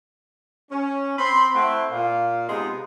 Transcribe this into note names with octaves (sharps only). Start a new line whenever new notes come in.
C#4
C4 B5 C6
A3 C4 E4 F#5
A#2 F5
C3 G#3 B3 D#4 F4